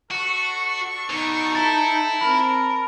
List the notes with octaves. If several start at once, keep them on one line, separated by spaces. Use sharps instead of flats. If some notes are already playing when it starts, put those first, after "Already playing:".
D4 F#4 A4 C#6
B2 D#4
E4 A4 A5 A6
C4 A#4 B5